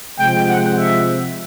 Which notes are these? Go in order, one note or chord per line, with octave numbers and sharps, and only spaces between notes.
C3 F3 G#3 G5
F#5
E5